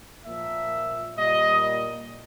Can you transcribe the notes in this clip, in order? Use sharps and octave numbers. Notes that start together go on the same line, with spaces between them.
A#2 F3 A#3 E5
A#2 G3 A#3 D#5